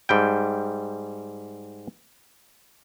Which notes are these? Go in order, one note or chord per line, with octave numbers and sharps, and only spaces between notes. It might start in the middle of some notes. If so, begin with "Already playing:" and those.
G#2 G3 G5